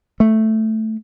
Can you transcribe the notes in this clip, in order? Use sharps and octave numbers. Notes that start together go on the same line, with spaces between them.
A3